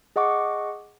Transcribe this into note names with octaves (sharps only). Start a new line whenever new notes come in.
G#4 D#5 F#5 C#6 D6